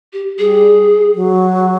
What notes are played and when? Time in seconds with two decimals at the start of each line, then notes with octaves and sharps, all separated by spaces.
0.13 G4
0.39 G3 G#4
1.15 F#3